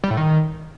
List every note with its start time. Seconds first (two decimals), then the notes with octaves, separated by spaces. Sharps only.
0.04 G3
0.10 A2
0.17 D#3